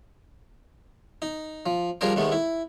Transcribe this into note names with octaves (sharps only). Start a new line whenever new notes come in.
D#4
F3
F3 G3 D4 G#4 A#4 C5
D#2 G#3 A3 B3
E4